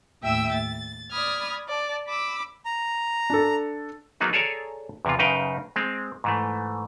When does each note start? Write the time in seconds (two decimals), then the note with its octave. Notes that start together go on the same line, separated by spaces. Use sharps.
0.21 D#2 A2 E5 G5 E6
0.51 A6
1.10 D5 B5 D#6 F6 G#6
1.67 D5 A5
2.07 B5 D6 E6
2.65 A#5
3.30 D4 A4
4.20 F#3 A#3 B3 D#4 G#4
4.33 G#4 A4 C#5 D5 G#5 A#5
5.05 E2 C3 E3 F4
5.19 F#2 C#3 D#4 B4 F5 G5
5.76 G#3 C4
6.24 G#2 E3 A3